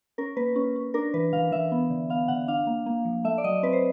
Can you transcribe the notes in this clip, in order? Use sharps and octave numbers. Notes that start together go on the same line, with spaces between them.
C#4 A#4
A#3 B4
C#4
C#4
D4 A#4
E3 B4
E3 F5
E3 E5
B3
D3
B3 F5
D3 F#5
D4 F5
A#3
A#3
F3
A3 E5
D5
F#3 D#5
C4 B4
C5